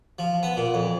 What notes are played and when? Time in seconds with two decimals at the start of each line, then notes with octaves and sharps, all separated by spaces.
0.19 F3
0.43 B3
0.57 A#2
0.74 F2